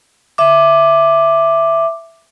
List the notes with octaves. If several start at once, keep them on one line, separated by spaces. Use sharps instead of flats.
E5 D6